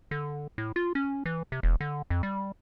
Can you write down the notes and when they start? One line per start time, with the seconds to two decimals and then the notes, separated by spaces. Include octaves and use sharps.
0.11 D3
0.58 A2
0.76 F4
0.95 C#4
1.26 E3
1.52 C3
1.63 E1
1.81 D3
2.10 F2
2.23 G3